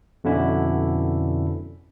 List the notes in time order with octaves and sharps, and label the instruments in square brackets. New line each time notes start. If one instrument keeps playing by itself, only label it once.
[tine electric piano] F2 B2 D3 C#4 E4